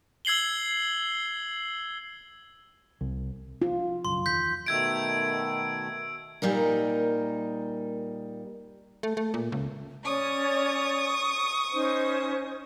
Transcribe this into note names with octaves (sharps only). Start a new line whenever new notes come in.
E6 G#6 C7 F#7 G7
C2
F4
B1 F#2 C#3 C6
E2 D#3 G6 B6
B2 D#3 A3 E6 G#6 D7
A#2 G3 D#4 A#4
A3
A3
A#2
C#2
C#4 C#5 D5 C#6 D#6
C#4 D#4 C5